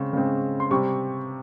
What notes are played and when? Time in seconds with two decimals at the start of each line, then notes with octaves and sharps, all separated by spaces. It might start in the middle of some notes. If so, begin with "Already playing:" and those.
Already playing: C#3 G#3 C4 C#6
0.13 C#3 G#3 C4
0.60 C6
0.71 C3 G3 C4 C#6